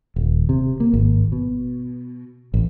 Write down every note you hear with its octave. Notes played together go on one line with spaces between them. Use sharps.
D#1
C3
A#3
G#1
B2
A1